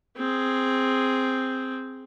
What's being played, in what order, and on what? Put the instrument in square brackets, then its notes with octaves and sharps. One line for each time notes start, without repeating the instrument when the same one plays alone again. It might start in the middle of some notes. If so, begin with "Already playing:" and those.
[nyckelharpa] C4 G#4